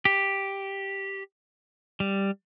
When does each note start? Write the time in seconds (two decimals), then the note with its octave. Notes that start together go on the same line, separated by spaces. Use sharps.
0.05 G4
2.00 G3